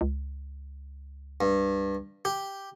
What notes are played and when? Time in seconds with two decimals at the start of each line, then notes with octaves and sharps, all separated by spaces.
0.01 C#2
1.41 G2
2.25 G4